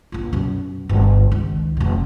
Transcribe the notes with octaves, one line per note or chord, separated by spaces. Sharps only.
A#1 F4
F#2 B2
G1
C#2 D#3
F1 B2